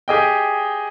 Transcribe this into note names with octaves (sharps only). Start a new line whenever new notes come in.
G4 G#4 D#5 G5